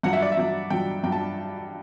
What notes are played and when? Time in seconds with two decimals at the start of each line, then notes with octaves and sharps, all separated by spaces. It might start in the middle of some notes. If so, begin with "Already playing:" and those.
0.03 G2 F#3 F#5
0.13 E5
0.22 D5
0.32 E5
0.37 G2 F#3
0.70 G2 F#3 G5
1.04 G2 F#3 G5
1.12 A5